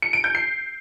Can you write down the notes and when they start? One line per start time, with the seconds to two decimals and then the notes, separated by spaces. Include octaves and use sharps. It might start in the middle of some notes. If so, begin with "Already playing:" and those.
0.02 C#7
0.13 D7
0.24 G6
0.35 C7